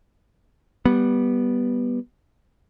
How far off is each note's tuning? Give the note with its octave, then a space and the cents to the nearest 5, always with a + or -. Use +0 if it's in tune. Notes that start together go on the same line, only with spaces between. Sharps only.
G3 +0 B3 -10